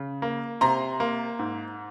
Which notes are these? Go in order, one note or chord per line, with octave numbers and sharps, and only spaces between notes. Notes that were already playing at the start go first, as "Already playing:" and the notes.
Already playing: C#3
A#3
C3 A#5 C6
A#3
G#2